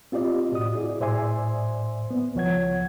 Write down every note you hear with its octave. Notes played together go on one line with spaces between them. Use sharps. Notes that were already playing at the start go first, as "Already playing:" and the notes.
C4 F4 G4 D5 D#5
A2 F#4 D#6
E4 G#4 D5
A2 C5 D5 E5 G#5 C6
B3
C#2 F3 C#5 F#5 G#6